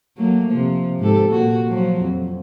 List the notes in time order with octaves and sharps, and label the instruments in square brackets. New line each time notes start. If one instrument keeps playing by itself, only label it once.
[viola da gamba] F#3 A3 A#3
C3 F3
G#2 G4 A4
A#2 F#4
F3 F#3 F#4
F2